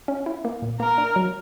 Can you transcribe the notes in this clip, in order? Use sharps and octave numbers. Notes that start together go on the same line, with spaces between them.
C#4
E4
A#3
A#2
A#3 A#4
D4
F#3